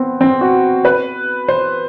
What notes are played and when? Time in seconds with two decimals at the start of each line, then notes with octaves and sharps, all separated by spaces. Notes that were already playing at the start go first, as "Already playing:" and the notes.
Already playing: B3 C4
0.21 C4
0.41 F#4
0.85 B4
1.48 C5